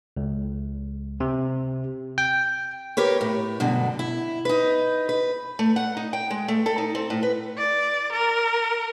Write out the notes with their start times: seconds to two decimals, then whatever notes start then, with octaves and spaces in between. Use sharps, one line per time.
0.17 C#2
1.20 C3
2.18 G5
2.97 G4 A#4 B4 C#5
3.21 A2
3.60 G2 B2 D3 F#3
3.99 E4
4.45 D#4 B4
5.09 B4
5.59 A3
5.76 F#5
5.97 D#4
6.13 G5
6.31 G#3
6.48 A3
6.66 A4
6.78 D#4
6.95 C4
7.10 A2
7.23 B4
7.57 D5
8.12 A#4